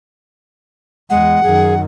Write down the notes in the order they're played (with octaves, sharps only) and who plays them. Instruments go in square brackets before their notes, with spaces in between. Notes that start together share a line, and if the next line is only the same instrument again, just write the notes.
[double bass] E2 [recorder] G#3 [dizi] F#5
[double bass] F#2 D#3 [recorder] G#4